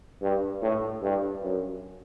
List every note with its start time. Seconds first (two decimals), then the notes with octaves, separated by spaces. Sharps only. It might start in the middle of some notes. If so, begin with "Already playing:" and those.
0.22 G2
0.62 A2
1.02 G2
1.43 F#2